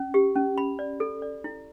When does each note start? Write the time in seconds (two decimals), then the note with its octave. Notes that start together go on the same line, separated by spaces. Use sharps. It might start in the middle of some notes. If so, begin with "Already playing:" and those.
Already playing: C#4
0.14 G4
0.36 C#4
0.58 B5
0.79 D5
1.00 A4
1.22 D5
1.44 E4